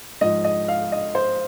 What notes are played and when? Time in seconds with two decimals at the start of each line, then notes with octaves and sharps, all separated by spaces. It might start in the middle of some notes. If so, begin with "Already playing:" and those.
0.21 G#2 F3 D#5
0.44 D#5
0.68 F5
0.92 D#5
1.15 C5